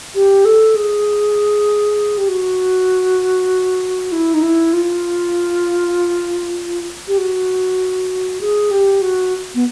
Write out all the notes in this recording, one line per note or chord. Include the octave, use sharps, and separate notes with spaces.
G4
A4
G#4
G4
F#4
E4
D#4
E4
F4
G4
F#4
G#4
G4
F#4
B3